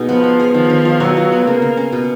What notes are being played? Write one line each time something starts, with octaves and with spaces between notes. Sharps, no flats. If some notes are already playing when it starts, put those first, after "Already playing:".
Already playing: B2 D#4 G#4
F3 B3
B3
G#4
D#3 F3
D#3
F4
B2 F#3
F4
B3
C#3 A#3
C#3
C#4
B2